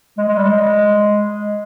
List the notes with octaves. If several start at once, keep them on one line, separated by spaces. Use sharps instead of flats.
G#3
G#3
G3
G#3